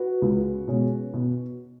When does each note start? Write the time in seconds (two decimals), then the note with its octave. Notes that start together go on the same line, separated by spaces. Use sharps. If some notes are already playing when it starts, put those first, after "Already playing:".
Already playing: F#4 B4
0.22 C#2
0.68 B2 G#3 C#4
1.14 B2